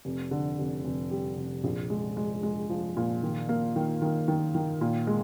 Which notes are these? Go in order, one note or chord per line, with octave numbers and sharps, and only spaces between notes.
F1
D3
F1
F1
G3
F1
A#1
G#3
G#3
G#3
F3
A#2
D#3
A#3
D#3
D#3
D#3
D#3
A#2
G#3